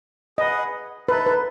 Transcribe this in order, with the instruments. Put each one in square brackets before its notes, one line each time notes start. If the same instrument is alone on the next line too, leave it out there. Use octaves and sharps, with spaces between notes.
[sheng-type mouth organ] G#4 B4 F#5 [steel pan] D#5
[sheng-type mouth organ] D#4 A4 E5 [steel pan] B4
[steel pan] B4